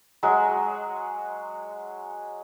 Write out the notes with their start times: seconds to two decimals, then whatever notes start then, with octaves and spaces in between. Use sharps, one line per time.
0.23 F#3 G#3